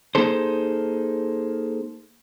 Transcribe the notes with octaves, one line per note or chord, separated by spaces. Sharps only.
A#3 D#4 G#4 A4 C5